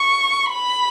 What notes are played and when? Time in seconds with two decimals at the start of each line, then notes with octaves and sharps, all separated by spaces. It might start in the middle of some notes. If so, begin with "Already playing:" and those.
Already playing: C#6
0.53 B5